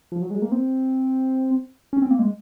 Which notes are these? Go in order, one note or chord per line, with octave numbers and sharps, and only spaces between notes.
F3
F#3
G#3
A#3
C4
C#4
C4
A#3
G#3